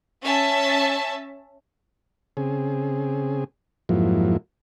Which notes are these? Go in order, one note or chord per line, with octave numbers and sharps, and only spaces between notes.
C#4 E5 A5
C#3 C4 G#4
F2 G#2 F3 F#3 A#3 E4